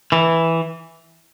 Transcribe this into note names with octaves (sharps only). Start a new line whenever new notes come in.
E3